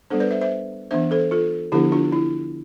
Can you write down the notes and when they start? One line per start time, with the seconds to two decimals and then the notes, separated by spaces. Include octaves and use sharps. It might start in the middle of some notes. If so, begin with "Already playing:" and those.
0.10 G3 B3 D4 A4 C5
0.20 B4 D5
0.31 C5 E5
0.41 C5 E5
0.91 E3 B3 D4 C5 E5
1.11 A4 C5
1.31 F4 A4
1.72 D3 F3 B3 D4 E4 G4
1.92 D4 F4
2.12 E4